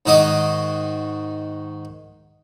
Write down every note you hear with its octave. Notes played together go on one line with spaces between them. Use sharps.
G#2 D#3 F#4 D#5 D6